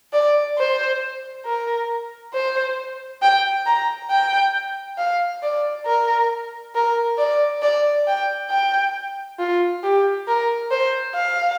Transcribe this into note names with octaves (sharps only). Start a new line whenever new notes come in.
D5
C5
A#4
C5
G5
A#5
G5
F5
D5
A#4
A#4
D5
D5
G5
G5
F4
G4
A#4
C5
F5